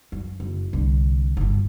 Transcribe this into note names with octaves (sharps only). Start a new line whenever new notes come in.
F#2
F#1
C2 D3
D1 G1